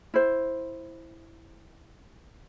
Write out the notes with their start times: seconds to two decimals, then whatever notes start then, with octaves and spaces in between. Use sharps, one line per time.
0.14 E4 C5